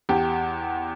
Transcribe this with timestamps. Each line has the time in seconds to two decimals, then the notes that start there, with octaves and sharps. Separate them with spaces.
0.09 E2 G4